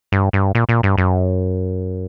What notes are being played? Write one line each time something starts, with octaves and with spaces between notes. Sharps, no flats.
G2
G2
A#2
A#2
G2
F#2